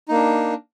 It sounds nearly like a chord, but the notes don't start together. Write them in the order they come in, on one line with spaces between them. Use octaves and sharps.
D#4 A#3 D4